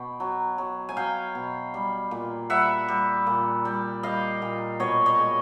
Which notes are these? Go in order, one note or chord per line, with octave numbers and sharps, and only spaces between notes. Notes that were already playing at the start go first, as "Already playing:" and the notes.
Already playing: B2 G5
F#3
F#3
G#5
F#3 F5 G5
B2
G3
A#2
G3 E5 F#5
G3
A#2
G3
G3 D#5 F5
A#2
B2 C#5 D#5
C#5 D#5
G#3